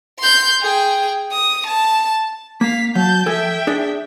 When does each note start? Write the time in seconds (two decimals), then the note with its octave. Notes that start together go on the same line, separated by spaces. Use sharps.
0.20 C6 G6
0.61 G#4 G5
1.32 D#6
1.67 A5
2.61 A#3 F5 B6
2.95 F#3 A5 G6
3.26 F3 A4 E5 G5 G#5
3.67 D4 G#4 D5